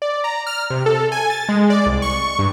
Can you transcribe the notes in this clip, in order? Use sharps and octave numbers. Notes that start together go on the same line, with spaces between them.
D5
A#5
F6
C3
A4
G#5
A6
G#3
D5
C2
C#6
G2